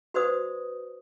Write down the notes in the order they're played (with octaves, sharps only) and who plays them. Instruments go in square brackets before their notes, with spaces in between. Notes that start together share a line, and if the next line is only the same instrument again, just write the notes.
[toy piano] F#4 B4 C5 D5 D#6